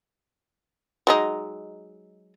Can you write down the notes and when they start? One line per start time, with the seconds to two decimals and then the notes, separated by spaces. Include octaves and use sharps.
1.07 F#3 G#3 D#4